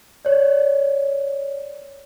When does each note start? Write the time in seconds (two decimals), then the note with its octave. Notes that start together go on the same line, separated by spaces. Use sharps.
0.25 C#5 D5